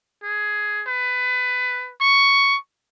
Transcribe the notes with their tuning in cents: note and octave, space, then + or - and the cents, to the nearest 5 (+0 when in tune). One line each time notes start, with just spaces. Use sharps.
G#4 +10
B4 +20
C#6 +5